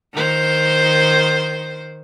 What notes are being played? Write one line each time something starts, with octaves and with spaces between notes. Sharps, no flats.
D#3 C5